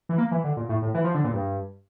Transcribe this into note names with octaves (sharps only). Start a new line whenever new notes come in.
E3
A#3
E3
D3
A#2
A2
A2
E3
F3
D3
A#2
G2